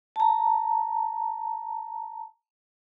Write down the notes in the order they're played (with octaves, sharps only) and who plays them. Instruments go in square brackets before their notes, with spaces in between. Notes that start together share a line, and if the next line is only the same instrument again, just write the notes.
[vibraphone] A5 A#5